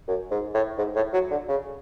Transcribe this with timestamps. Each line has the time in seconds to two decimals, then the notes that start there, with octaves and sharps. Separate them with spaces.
0.08 F#2
0.31 G#2
0.54 A2
0.78 G#2
0.96 A2
1.13 F#3
1.31 D3
1.48 C#3